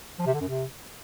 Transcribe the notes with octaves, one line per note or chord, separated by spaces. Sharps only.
F3
C3
D3
F#2
C3